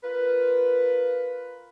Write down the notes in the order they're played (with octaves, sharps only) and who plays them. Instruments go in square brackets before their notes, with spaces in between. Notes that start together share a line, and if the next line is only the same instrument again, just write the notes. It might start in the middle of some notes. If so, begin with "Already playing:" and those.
[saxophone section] F4 A#4 B4